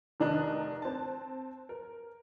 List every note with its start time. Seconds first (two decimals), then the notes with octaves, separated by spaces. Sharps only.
0.20 F1 D#3 D4 D#5 A#5 F#6
0.82 C4 A5
1.69 A#4